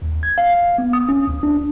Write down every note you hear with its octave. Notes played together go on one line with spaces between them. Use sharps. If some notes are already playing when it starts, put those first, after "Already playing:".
D#2
G#6
F5
B3
D#6
C#4
D2
D4